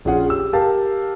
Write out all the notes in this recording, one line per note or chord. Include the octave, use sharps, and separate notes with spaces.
A#1 C#4 F4 G#4 F#5
G4 E6
G4 A#4 F5 A5